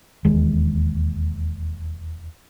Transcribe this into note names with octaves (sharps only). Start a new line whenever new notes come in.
E1 D#2 G#3